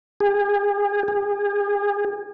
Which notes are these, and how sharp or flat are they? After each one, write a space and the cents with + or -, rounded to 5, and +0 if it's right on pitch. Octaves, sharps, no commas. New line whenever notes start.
G#4 -40
G#4 -40